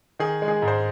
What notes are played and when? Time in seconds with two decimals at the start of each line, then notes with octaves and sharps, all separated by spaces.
0.19 D#3 G#4
0.42 G#3
0.48 G#4
0.62 G#2
0.68 C5